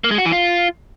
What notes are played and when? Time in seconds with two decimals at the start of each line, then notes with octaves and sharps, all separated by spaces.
0.04 A#3
0.11 G#3
0.18 F#4
0.25 E3
0.32 F4